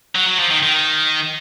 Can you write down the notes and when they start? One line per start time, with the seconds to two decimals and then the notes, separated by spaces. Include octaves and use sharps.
0.15 F#3
0.27 F#3
0.39 F3
0.51 D#3
0.63 D#3